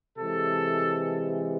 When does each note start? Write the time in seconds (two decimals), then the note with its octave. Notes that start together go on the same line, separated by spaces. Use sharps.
0.18 C3 E3 G#3 A4